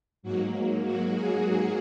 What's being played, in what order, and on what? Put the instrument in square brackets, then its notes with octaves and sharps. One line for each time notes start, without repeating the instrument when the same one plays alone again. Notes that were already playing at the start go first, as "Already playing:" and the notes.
[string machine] G#2 F#3 A#3 F#4
F#4
G#4